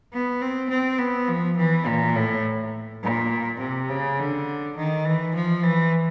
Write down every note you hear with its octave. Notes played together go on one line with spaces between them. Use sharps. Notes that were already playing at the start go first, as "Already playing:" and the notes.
B3
C4
C4
B3
F3
E3
A#2
A2
A#2
C3
C#3
D3
D#3
E3
F3
E3